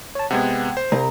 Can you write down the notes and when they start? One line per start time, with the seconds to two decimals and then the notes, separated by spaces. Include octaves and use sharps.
0.15 C#5 A5
0.31 C3 G#3 B3 F#5 G5 G#6
0.77 C5
0.92 C2 A#5